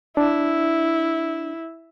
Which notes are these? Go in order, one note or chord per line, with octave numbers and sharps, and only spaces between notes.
D4 E4